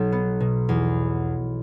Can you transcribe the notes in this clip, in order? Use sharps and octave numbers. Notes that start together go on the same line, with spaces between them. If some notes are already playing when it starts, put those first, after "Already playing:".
Already playing: B1 F#3
B3
B2
E2